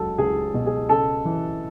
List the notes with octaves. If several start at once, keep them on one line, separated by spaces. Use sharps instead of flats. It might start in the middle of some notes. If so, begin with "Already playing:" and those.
Already playing: C#2 F#3 A4
C#2 G#4
B2
G#4
C#3 A4
E3